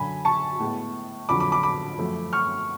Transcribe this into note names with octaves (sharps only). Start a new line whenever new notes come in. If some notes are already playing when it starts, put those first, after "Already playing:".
Already playing: F#2 D3 F#3 G#5 B5
A5 C#6
A2 G#3 B3
F2 D3 F#3 B5 D6
B5 D6
B5 D6
B5 D6
F#2 F3 A3
C#6 F6